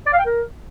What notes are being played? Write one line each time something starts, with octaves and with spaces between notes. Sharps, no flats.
D5
F5
G5
A#4